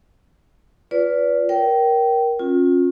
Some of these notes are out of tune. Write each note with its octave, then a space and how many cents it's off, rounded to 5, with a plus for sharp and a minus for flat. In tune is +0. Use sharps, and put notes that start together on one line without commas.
F4 +0 B4 +0 D5 -30
A#4 +15 C#5 +0 G5 -20
C#4 -30 F4 +30